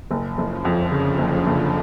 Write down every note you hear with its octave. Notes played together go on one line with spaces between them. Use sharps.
F#1 C#3 F3
F#1
F2 D3
C#3
F#1
F#1